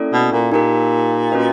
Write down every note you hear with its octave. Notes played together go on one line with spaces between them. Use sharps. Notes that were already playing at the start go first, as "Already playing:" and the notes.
Already playing: A#3 C#4 E4 A4 D5
B2
A#2
A#2 D#4 G4 A#4
C#4 F#4 B4 D#5